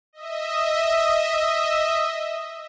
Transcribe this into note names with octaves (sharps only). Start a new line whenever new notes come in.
D#5 E5